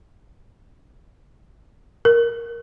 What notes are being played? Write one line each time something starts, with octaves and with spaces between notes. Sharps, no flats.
A#4